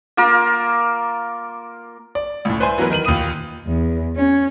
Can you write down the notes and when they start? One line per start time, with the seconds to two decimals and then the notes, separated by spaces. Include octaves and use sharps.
0.17 A#3 F4 A#4
2.15 D5
2.45 C#2 A2
2.60 B4 C5 D5 E5 G#5 C6
2.78 E3 F#3 B3 A#4 B4
2.90 D#3 A#4 D#7 F#7
3.05 D#2 A#2 B5 D#6 D#7
3.67 E2
4.16 C#4